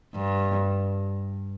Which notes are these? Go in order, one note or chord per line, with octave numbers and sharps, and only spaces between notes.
G2